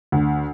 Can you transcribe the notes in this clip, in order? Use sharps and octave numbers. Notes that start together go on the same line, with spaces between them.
D2